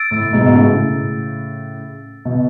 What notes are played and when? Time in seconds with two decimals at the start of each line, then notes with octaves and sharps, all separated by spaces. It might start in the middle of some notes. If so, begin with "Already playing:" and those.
Already playing: E6 A6 D7
0.11 A2
0.33 G#2 B2
0.46 B2
0.54 A2 C#3
2.25 B2